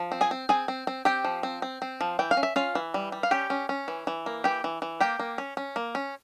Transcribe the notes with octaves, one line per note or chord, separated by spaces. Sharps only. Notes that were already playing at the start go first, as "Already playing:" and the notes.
Already playing: F3
C4
G#4 G#5
C4
C4 G#4 G#5
C4
C4
C4 G4 G5
F3
C4
C4
C4
F3
E3 G5
F5
C#4
E5
C#4 F4 F5
E3
G3
G3
F5
C#4 G4 G5
C#4
C#4
E3
E3
A#3
E3 G4 G5
E3
E3
A#3 G4 G5
A#3
C#4
C#4
A#3
C#4